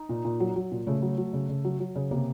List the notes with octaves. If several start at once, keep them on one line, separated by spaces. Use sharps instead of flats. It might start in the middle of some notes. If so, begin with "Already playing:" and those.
Already playing: D#4
A#2
A#2
F#3
F#3
A#2
C#3 A3
F#3
F#3
C#3
C#3
F#3
F#3
C#3
C3 A#3